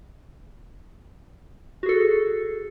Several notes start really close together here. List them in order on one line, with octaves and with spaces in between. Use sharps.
F#4 G#4 A4